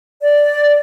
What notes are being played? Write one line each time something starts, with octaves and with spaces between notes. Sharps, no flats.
D5